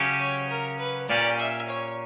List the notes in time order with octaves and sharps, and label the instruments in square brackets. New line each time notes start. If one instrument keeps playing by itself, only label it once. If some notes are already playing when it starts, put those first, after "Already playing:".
Already playing: [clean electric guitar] C#3 F#3 C#4 G4
[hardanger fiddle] C#5
A#4
B4
[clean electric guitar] A#2 A#3 C#4 G4 [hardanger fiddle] D5
[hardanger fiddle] E5
C#5